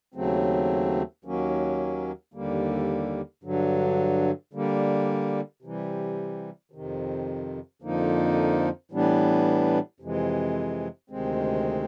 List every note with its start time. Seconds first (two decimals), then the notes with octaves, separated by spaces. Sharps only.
0.14 D#2 C#3 F#3 A3 C4
1.24 D#2 D#3 F#3 A#3 C#4
2.34 D#2 D3 G3 A#3
3.43 G2 D3 F#3
4.53 D3 G3 A#3
5.62 C3 E3 G3
6.71 F2 C3 D#3
7.82 F2 D3 F3 A#3 D#4
8.91 A2 E3 G3 B3 D4
10.00 F2 C3 E3 G#3
11.10 D2 C3 D#3 G#3 C4